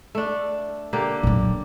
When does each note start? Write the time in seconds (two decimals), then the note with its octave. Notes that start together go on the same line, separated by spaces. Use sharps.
0.15 A3 D4
0.93 D3 A#3 G4
1.23 A#2 F#3